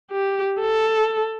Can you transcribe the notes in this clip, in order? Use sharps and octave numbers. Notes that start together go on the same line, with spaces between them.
G4
A4